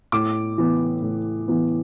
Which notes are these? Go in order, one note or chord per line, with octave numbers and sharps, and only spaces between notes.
A2 D6
E3 B3
A2
E3 B3